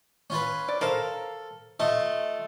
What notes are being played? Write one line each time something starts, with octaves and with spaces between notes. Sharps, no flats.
C#4 F4 B4
D5
A4 A#4 C5 F5
A3 F4 D#5